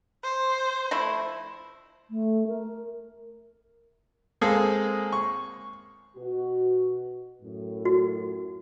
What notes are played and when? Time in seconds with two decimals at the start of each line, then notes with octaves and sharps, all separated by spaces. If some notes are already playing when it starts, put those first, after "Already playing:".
0.24 C5
0.91 F3 A3 E4
2.10 A3
2.47 A#4
4.41 G#3 A#3 C4 G#4 A4
5.12 C#6
6.16 B2 F#4
7.42 F#2 A2
7.85 F#4